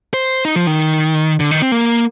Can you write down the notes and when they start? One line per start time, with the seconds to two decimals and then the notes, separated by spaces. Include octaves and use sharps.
0.14 C5
0.45 D#4
0.56 F3
0.67 D#3
1.40 D3
1.51 D#3
1.62 C4
1.72 A#3